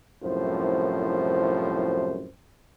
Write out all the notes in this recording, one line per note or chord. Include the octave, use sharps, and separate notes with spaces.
C2 F#2 A2 F3 C5